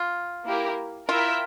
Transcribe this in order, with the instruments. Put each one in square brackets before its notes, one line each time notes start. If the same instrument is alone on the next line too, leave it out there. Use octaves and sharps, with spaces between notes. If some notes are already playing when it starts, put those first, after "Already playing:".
Already playing: [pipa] F4
[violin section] A#3 E4 G4 A#4
[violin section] E4 A#4 E5 G5 [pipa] F4